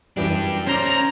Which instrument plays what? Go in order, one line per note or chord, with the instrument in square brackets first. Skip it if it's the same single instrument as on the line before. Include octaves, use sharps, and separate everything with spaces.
[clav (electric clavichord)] F#2 E3 G3 [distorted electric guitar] D4 G4
[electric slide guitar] C#4 [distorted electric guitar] C5 D5 [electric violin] A#5